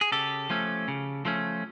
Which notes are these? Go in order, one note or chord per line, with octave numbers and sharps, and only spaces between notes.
G#4
C#3 G4 A4
F3 A3 C#4
C#3
F3 A3 C#4